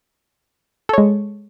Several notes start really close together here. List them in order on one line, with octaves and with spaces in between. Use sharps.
A4 C#5 G#3